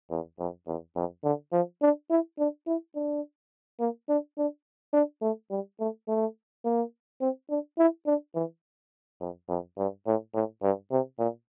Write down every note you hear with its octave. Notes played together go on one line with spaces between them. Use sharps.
E2
F2
E2
F2
D3
F3
D4
E4
D4
E4
D4
A#3
D4
D4
D4
A3
G3
A3
A3
A#3
C4
D4
E4
D4
E3
F2
F2
G2
A2
A2
G2
C3
A#2